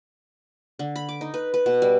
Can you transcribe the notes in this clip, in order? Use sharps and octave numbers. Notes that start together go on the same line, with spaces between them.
D3
B5
D6
D#4
B4
B4
B2
G3